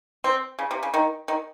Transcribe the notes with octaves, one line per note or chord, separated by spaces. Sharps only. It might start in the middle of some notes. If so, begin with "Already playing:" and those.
C4
C#3
C3
C#3
D#3
D#3